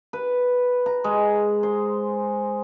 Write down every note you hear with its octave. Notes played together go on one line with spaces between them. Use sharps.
B4
A#5
G#3
C5